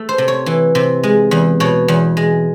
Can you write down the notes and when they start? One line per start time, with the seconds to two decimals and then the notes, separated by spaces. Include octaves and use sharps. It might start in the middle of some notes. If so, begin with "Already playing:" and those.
Already playing: A3
0.09 C5
0.18 C3
0.28 C#5
0.46 E3
0.75 C3
1.03 G#3
1.31 E2
1.60 B2 C#5
1.88 E2
2.17 G#3